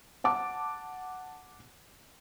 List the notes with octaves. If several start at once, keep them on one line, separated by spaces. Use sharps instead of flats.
F#5 A5 D6